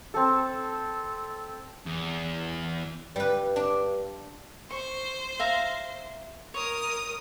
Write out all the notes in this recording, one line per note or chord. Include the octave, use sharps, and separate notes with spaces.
C4 A4
E2
G2 G3 B4
D4
C5 C#6
E5 F5 A#5
A#4 C#5 D#6